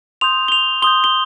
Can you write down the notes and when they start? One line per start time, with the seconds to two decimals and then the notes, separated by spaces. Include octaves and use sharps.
0.21 C6 D#6 G6 F7
0.48 G7
0.52 F7
0.82 C6 D#6 G6 G7
1.04 G7